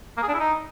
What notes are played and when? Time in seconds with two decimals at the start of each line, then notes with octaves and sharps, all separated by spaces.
0.17 A#3
0.23 G#4
0.28 D4
0.34 E4
0.40 D#4